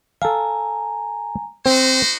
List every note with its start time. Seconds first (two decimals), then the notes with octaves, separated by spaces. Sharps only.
0.22 A4 F5 G#5 A#5
1.66 C4 D#4 F#4 C5